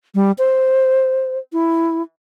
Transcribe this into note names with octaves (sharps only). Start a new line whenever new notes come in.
G3
C5
E4